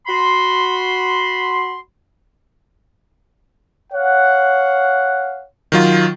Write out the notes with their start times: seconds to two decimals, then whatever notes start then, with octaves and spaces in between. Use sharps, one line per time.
0.07 F#4 B5 C6
3.93 C#5 F5 F#5
5.72 D#3 F#3 F4